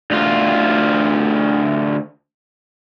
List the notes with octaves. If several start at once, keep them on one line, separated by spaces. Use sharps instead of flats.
D2 F4